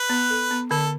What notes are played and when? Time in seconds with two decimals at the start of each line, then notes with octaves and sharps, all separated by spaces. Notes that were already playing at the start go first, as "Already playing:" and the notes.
Already playing: B4
0.10 B3
0.30 A4
0.51 B3
0.71 D3 A4